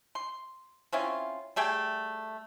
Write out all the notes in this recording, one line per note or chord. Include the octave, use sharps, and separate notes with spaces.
C6
C4 C#4 E4 F4
G3 A3 G#4 G5